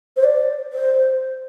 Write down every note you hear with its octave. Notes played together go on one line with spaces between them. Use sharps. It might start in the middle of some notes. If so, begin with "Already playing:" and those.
C5
D5
C5